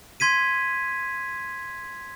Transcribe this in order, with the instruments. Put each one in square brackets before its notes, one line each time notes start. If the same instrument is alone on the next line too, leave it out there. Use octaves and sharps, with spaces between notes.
[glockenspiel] C6 G#6 B6 D#7